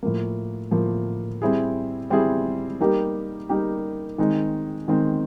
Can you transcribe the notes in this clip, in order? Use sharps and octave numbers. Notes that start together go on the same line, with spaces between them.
A2 F3 A#3
A2 F3 A#3
G3 C4 E4 G#4
G3 C4 E4 G#4
G3 A#3 D#4 G4 A#4
G3 A#3 D#4 G4 A#4
D#3 G#3 C4 D#4
D#3 G#3 C4 D#4